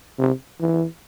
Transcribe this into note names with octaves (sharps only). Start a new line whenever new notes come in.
C3
E3